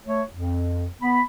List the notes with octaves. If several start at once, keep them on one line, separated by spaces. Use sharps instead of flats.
A3 C#5
F2
B3 B5